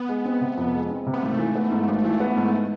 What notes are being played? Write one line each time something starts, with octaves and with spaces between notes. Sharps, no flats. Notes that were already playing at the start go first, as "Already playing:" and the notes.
Already playing: B3
G#3
C4
C3
F2
G#3
C4
C3
B3
G#1 A3
E3
B3
G#2
G#1
E3
B3
G#2